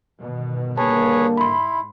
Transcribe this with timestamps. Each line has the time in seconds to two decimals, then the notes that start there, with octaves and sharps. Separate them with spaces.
0.21 G1 B2 D#3
0.77 D3 G3 A#3 G#4 B4 C#5 A5
1.37 G#2 E4 B5 C6